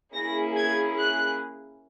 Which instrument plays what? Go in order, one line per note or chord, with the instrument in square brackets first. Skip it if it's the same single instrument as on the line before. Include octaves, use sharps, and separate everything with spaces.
[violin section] A#3 C#4 E4 G#4 A#6
G#6
F#6